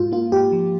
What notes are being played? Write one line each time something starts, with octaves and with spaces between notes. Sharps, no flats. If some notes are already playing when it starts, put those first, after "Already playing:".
Already playing: G#2 F4
A#3 F4
G#2 G4
F3